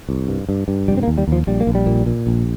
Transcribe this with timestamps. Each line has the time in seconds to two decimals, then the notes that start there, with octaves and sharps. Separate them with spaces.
0.09 C2
0.28 G2
0.49 G2
0.68 G2
0.88 F1 G3
0.97 C4
1.03 A#3
1.08 D#2
1.18 G3
1.28 D#2 F3
1.47 A#1 G3
1.61 A#3
1.67 A#1
1.75 G3
1.87 A#2
2.06 A#2
2.27 A#1